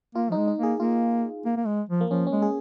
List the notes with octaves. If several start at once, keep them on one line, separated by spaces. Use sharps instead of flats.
A#3 F4
F3 D#4
G#3
D#4
A#3 G#4
A#3 F4
A#3
A#3
G#3
F3
A#3
F3 C#4
C#4
G#3
G#4